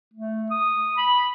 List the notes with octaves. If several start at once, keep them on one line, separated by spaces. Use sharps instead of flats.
A3
D#6
B5